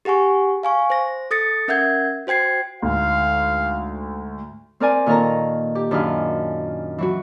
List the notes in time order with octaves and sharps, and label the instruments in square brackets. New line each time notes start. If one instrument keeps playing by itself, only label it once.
[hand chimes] G4 G#4 F#5 G#5 C#6
F5 G#5 C#6
C5 A#6
A4 D#6 A6 A#6 C#7
C#4 A#4 E5 F#5 G6 G#6
F#4 C5 G5 G#6 C7
[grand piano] D2 G#2 [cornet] F5
[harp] C4 A#4 D5 G#5
A#2 D#3 A4 A#4 C#5 A#5
G4
F#2 D#3 D4 E4 G#4 F5
E3 F#3 F#4